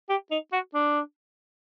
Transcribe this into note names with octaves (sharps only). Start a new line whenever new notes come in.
G4
D#4
F#4
D4